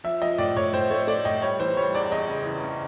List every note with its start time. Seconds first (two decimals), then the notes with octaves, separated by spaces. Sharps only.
0.04 F3 E5
0.22 F3 D#5
0.38 A2 D5
0.56 A2 C#5
0.74 A2 C5
0.91 A3 C#5
1.07 A3 D5
1.25 A2 D#5
1.42 G3 C#5
1.60 E3 C5
1.77 G3 C#5
1.94 E2 D5
2.11 E2 D#5
2.28 C#3
2.45 E3
2.63 C#3